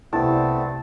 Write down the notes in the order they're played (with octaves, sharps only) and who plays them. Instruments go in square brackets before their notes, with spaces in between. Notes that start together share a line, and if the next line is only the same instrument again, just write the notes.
[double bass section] C2 G3 [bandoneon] A3 B3 C4 [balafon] E4 [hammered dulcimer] A5